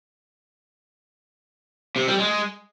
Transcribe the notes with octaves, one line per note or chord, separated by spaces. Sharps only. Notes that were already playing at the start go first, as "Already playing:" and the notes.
C3
G3
G#3